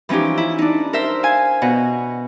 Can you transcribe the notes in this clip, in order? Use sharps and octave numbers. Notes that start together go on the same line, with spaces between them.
E3 F3 C#4 D#4 G4
E4
D4 D#4
A#4 C5 E5
F5 G#5
B2 D#5 F#5